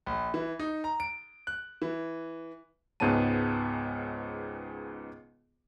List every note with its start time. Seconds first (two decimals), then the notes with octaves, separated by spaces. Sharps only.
0.06 A#1
0.34 E3
0.59 D#4
0.84 A#5
1.00 D7
1.47 F#6
1.82 E3
3.00 C#2 G#2 B3 C#4 A5 D#7